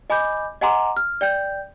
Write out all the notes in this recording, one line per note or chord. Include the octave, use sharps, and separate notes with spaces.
D#5 G#5 B5 D6 G6
D#5 F#5 G#5 A#5 C6 D6
F6
D5 G5 G6